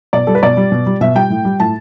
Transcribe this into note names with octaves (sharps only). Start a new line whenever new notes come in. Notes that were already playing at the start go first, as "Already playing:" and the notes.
B2 D5
G3 A4
B4
B2 D5
G3
B2
G3
B2 E5
G3 G5
A2
G3
A2 A5